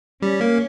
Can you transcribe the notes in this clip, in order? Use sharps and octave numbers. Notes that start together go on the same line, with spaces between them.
G3 C#4
A#3